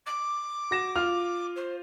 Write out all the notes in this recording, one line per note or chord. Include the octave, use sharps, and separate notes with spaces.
D6
F#4 A#6 E7
F4 F6
C5